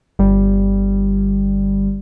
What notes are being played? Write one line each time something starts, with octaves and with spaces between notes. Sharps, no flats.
G1 G3